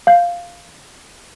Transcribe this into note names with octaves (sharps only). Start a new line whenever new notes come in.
F5 G6